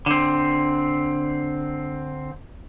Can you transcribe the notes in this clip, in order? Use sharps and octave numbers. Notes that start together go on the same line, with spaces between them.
D3 C4